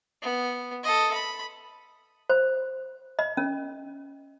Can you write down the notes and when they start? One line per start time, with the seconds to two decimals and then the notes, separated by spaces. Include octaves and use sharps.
0.22 B3
0.83 A4 D#5
1.14 B5
2.30 C5
3.19 D#5
3.37 C#4